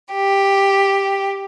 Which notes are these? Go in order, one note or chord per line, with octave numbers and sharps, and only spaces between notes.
G4